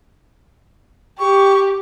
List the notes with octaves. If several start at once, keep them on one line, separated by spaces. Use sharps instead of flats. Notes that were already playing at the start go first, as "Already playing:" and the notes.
G4 C#6